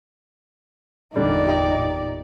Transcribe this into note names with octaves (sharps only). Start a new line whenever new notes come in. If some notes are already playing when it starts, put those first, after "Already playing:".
G1 E2 A#2 D3 G3 D#4 D5
G4 D#5